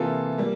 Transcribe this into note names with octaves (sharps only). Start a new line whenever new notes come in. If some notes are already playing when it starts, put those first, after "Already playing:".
Already playing: C3 E3 A#3 F4 A4
G3 A#3